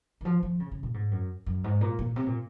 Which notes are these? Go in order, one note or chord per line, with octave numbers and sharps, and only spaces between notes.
D#3
F3
F3
C#3
C#3
A#2
G#2
F#2
F#2
G#2
A#2
A#2
C3
A#2